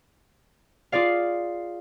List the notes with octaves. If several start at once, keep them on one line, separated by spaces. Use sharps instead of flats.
F4 G#4 D5 F5